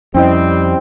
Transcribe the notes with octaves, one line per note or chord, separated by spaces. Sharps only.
F2 G3 C4 C#4 E4 D#5